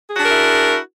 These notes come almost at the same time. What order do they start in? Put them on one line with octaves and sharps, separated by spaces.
G#4 F#4 D4 A#4 E4